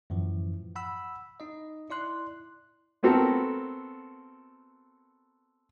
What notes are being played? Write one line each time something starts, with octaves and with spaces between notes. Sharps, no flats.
F#2 A2 E3 F3
F#5 B5 E6
D#4 D#5
E4 D5 C6 F#6
A3 B3 C4 F#4 A4 A#4